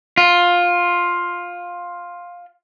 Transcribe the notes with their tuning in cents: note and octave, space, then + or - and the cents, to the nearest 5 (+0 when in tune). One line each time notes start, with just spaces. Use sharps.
F4 +10